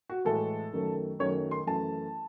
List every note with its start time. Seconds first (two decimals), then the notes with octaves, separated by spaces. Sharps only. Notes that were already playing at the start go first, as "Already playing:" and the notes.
0.10 F#4
0.25 A2 E3 G#3 A4
0.73 F#2 D#3 F#3 A3
1.19 F#2 D#3 F#3 A3 C#5
1.51 C6
1.67 F#2 E3 A3 A5